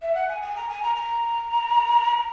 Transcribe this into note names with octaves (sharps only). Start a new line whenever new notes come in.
E5
F#5
G#5
G#5
A#5
G#5
A#5
A#5
A#5